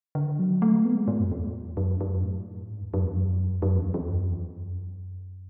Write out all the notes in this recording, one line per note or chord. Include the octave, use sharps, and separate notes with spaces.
D3
F#3
A3
B3
G#3
A2
F#2
E2
F#2
F#2
A2
G#2
E2
F#2
E2
F#2
F#2
E2
E2
F#2
E2
F#2